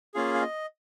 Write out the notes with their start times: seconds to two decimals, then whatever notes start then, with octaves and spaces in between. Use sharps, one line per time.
0.14 A#3 C#4 F4 G#4 F5
0.34 F5
0.42 D#5